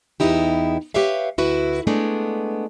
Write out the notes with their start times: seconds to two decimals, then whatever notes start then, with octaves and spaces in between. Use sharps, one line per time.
0.20 E2 G2 B3 D#4 E4 G4
0.94 G4 B4 C#5 E5 F5
1.38 D2 E4 F#4 B4 E5
1.87 G#3 A3 B3 D4